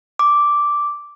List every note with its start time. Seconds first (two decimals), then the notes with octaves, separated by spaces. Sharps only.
0.19 D6